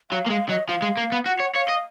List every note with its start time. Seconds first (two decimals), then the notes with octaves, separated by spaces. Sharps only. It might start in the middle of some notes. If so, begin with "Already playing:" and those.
0.11 F#3 F5
0.26 A#3
0.30 G#3 F5
0.49 F#3 D#5
0.68 F3 F5
0.82 G#3
0.97 A#3
1.12 B3
1.26 F#4 F#5
1.39 C#5
1.54 C#5 F5
1.68 D#5